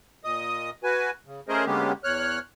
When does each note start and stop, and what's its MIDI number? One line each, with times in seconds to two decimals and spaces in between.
0.24 0.70 46
0.24 0.70 75
0.24 0.70 87
0.84 1.10 66
0.84 1.10 71
0.84 1.10 80
1.26 1.40 49
1.48 1.65 57
1.48 1.65 61
1.48 1.65 68
1.48 1.65 70
1.48 1.65 72
1.48 1.65 75
1.66 1.92 50
1.66 1.92 56
1.66 1.92 58
1.66 1.92 59
1.66 1.92 61
1.66 1.92 67
2.04 2.39 40
2.04 2.39 73
2.04 2.39 89
2.04 2.39 90